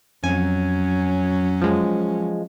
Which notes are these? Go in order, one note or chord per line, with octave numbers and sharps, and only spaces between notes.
F2 F#3 C#4 G#5
F3 G#3